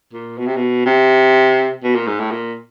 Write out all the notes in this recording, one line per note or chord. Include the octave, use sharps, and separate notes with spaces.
A#2
B2
C3
B2
C3
B2
A#2
G#2
A2
A#2